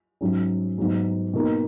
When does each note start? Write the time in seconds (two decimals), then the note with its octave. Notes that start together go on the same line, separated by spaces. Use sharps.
0.21 G#2 F#3 C#4
0.78 G#2 F#3 B3
1.34 B2 A#3 D#4